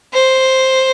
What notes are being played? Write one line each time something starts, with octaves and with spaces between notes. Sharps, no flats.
C5